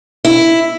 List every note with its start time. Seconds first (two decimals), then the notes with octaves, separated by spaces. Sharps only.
0.25 E4